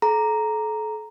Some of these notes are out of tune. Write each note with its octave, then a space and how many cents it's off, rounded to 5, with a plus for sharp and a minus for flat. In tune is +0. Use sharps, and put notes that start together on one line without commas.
A4 -35 A#5 +0